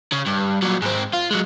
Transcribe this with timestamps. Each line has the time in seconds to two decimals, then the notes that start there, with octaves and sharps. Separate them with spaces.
0.12 C#3
0.26 G2
0.63 A#2 F#3
0.82 G#2 C4
1.13 F4
1.31 F#3 G#3